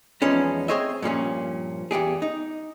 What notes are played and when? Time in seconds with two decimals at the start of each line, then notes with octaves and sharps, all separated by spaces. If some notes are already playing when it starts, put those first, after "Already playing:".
0.22 E2 F3 G#3 B3 C#4 D#4
0.68 C4 G#4 C5 C#5 D#5 E5
1.02 G2 A#2 F3 C#4
1.91 E2 G#2 G4 G#4
2.22 D#4